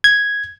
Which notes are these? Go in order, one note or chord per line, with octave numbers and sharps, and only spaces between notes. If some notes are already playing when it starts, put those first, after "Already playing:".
G#6